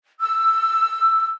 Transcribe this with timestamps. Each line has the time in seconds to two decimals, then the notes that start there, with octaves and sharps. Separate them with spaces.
0.20 E6